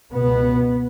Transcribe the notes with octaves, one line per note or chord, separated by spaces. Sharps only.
C#2 B2 B3